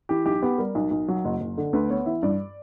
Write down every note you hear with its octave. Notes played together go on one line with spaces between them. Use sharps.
E3 G4
B1 G4
B3 G4
G3 A#4
B1
B1
F#3
F#1
F#1
D3
D2 B4
B3 C#5
E3 E5
G2 D5